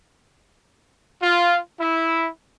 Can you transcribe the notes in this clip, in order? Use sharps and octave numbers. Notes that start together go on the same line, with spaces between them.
F4
E4